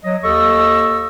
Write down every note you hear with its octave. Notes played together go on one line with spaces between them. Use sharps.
F#3 D#5
D#2 A4 D#5 C#6 E6